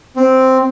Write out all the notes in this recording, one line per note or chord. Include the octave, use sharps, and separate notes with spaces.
C4